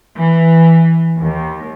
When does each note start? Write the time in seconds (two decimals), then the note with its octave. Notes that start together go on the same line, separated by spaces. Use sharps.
0.17 E3
1.20 D#2